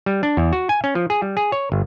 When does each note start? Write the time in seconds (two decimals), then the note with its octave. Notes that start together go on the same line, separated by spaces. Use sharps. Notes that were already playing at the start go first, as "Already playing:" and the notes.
0.06 G3
0.23 D4
0.37 E2
0.53 F#4
0.69 G#5
0.84 C#4
0.95 F3
1.10 G#4
1.22 G3
1.37 G#4
1.52 C#5
1.72 G1